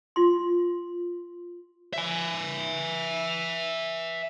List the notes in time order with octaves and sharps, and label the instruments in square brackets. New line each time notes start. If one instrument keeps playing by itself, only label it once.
[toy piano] F4 C6
[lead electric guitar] E5 G#5